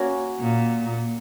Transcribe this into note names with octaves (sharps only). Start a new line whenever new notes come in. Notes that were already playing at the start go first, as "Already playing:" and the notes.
Already playing: A#3 C#4 F#4 C#5
A#2